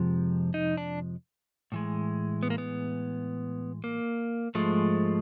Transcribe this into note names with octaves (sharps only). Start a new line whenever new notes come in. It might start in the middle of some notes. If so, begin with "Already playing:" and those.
Already playing: F2 C3 F3 G#3
D#4
D4
A2 E3 G#3
B3
A#3
B3
A#3
G#2 F3 G#3 A3